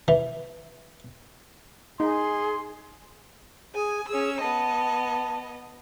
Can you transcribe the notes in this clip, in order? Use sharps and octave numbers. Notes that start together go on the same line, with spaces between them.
E3
D#4 G#4 C6
G#4 G#5
C#4 G#4 E6
B3 D#5 A5